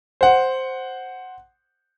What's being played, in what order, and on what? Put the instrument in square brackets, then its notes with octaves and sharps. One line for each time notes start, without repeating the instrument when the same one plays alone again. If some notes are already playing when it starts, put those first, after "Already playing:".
[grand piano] C5 F#5